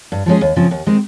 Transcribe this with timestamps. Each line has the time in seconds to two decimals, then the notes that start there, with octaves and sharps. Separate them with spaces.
0.12 G2
0.26 F3 G#3 C#4 G#4
0.41 D#2
0.56 C#3 F3 C4
0.71 D#2
0.86 D#3 G#3 C4